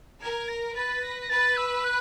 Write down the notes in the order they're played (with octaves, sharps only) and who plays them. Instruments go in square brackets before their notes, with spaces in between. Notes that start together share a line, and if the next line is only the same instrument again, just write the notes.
[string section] A#4 [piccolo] G#6
[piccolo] A#6
[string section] B4 [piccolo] A6
[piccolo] A#6
A#6
[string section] B4 [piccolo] A6
[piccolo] E6
F#6